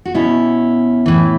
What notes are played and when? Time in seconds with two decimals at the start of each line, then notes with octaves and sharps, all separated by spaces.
0.06 F#4
0.14 B2 C#4 E4
1.06 A2 E3